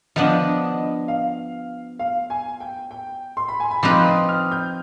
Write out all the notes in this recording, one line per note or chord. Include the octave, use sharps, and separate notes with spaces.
F3 B3 D4 D#5
F5
F5
G#5
G5
G5
C6
B5
G#5
B5
F3 C4 D#4 B4 D6
D#6
F6
G6